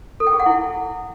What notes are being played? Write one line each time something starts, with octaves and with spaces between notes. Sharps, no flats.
A4
G5
G#4
F#5
E4